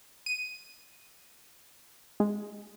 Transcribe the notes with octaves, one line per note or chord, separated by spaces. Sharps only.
D#7
G#3